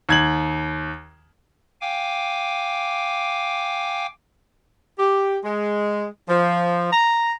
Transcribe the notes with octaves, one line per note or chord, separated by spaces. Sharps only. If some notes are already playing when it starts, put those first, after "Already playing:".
D#2 G#6 F#7
F5 G5 G#5 D6
G4
G#3
F3
A#5